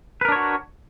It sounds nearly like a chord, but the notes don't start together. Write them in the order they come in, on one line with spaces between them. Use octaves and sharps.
B4 A#4 D4 C#5 F#4